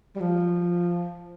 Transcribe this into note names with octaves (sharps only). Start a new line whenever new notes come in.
G3
F3